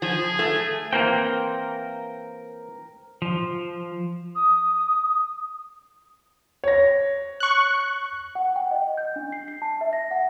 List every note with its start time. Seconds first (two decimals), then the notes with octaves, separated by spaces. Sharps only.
0.02 F3 G#4
0.39 A3
0.93 E3 A#3 C4 A#4 G5
3.22 F3
4.35 D#6
6.64 C#5 A#6
7.40 C#6 F#6
8.35 F#5
8.56 G5
8.71 D#5
8.97 G6
9.16 D4
9.32 C7
9.48 C7
9.62 A5
9.81 E5
9.93 A#6
10.11 F#5